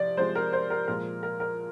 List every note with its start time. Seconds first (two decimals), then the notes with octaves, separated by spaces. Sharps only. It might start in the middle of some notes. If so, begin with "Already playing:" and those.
Already playing: C3 F3 D5
0.17 C3 F3 G#3 C5
0.35 A#4
0.53 C5
0.70 A#4
0.88 A#2 F3 G#3 A#4
1.23 A#4
1.40 A#4